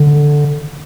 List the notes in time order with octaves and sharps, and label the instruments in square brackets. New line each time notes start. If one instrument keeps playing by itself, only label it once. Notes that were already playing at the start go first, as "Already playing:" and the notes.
Already playing: [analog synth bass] D3